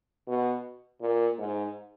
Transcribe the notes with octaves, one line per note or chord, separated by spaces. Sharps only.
B2
A#2
G#2